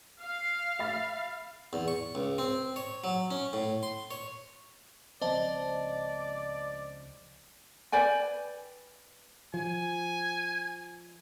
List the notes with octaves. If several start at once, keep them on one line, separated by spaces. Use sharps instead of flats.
F5
E5 B5 A6
E2
C#6
C#2
C4
C#5
F#3
C#4
A2
C6
C#5
C#2 F3 C4 C5 D5 D#5 A5
B4 D5 G5 G#5
F3 G#5